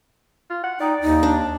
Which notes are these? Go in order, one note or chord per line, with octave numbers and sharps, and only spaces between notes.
F4
F#5
D#4 D5 G5
D#2 D#4
D4